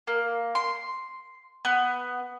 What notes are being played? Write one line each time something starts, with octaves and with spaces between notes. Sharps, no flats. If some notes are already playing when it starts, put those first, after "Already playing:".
A#3
C6
B3